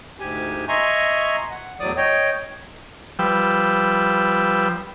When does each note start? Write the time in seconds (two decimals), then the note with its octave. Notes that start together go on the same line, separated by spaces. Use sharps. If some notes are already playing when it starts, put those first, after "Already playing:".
0.20 D2 G#2 G4 G#5
0.69 D#5 E5 G#5 A#5 C6 C#6
1.51 F#5
1.80 E2 A2 F#3 D5 D#6
1.97 C#5 D#5 G5
3.19 F3 G3 B4 G5 E6